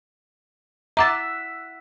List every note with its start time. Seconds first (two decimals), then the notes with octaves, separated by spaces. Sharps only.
0.97 E5 F#5 A#5 D6 A6